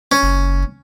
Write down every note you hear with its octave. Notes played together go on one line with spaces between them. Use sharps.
C#4
F#1